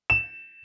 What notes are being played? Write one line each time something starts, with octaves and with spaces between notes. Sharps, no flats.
E7